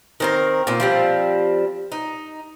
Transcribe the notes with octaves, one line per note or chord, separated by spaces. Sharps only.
D#3 C4 A#4
A#2 C4
F3 G3 C4
D#4